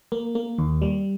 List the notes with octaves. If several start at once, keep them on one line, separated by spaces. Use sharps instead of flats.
A#3
A#3
D#2
G3